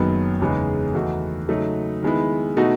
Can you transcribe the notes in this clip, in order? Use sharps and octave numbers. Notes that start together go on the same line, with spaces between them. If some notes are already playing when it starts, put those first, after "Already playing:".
Already playing: F#1 F#2 D#3 F#3 B3
E2 C#3 G#3 B3 D#4
E2 D#3 A3 D#4 F#4
C#3 F#3 A3 D#4
D#3 G#3 B3 E4
B2 A3 D#4 F#4